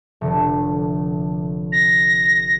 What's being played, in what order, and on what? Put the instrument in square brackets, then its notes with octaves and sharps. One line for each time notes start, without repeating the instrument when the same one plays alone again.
[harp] F1 D3
[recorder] A#6